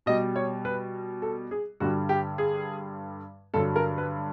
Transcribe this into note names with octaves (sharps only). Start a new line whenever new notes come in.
B2 G3 D#5
C#5
B4
A4
G#4
G2 D3 G3 F#4
G4
G#4
G2 D3 F#3 A4
A#4
B4